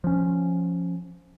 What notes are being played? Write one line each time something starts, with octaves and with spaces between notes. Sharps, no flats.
F3 C#4